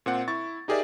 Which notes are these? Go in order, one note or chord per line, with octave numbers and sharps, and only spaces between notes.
A#2 C4 F#5
E4 C#6 A6
D#4 G4 G#4 A#4 D5 E5